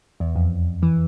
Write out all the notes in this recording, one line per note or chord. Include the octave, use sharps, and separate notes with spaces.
E2
F2
E3